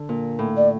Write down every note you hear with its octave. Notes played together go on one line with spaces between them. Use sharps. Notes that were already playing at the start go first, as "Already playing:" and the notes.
Already playing: D3
A#2
A2
D5